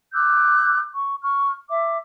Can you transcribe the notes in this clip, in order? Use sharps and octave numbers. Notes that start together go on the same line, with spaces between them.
D6 E6 F#6 G6
C#6
C#6 F6
E5 D6